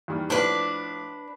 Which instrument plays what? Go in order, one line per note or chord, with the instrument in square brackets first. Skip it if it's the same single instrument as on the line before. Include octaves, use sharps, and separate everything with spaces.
[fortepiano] E2 D#3 G3
[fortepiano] A2 F3 [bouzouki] D4 B4